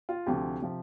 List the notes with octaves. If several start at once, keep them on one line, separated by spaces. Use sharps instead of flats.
F4
D2 C3 F3 G4
C3 F3